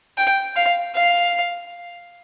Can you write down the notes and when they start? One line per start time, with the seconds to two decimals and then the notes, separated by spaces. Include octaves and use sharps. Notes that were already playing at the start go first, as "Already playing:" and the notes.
0.18 G5
0.56 F5
0.95 F5